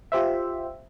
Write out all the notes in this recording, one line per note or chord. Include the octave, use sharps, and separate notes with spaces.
F4 G4 C5 E5